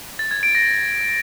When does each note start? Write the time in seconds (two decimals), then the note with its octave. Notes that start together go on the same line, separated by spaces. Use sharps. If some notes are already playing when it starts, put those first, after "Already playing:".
0.19 A6
0.31 G#6
0.43 D7
0.55 A#6